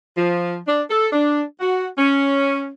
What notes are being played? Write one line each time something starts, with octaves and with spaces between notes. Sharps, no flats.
F3
D4
A4
D4
F#4
C#4